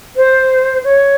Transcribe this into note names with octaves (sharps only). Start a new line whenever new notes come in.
C5
C#5